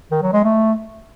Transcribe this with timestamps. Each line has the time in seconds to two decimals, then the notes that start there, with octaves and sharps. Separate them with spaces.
0.11 D#3
0.22 F#3
0.33 G#3
0.44 A3